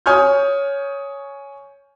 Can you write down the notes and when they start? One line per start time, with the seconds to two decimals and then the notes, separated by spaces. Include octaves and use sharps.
0.06 C#5 G#5 C#6 D#6 F6 G6